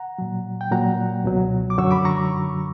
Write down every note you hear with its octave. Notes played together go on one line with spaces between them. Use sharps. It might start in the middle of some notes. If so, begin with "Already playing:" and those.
Already playing: F#5 A#5
A#2 F#3
G5
A#2 F#3 F#5 A#5
C#2 B2 F#3
D6
F#2 D3 F#3 C#6 E6
B5 D6
A#5 C#6